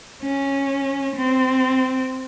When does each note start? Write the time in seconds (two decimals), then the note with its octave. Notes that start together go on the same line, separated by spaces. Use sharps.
0.22 C#4
1.16 C4